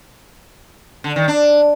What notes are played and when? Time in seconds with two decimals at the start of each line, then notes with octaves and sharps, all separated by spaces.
1.04 D3
1.16 D#3
1.28 D4